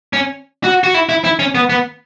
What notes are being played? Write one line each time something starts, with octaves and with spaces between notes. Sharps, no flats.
C#4
F#4
F#4
E4
E4
E4
C#4
B3
B3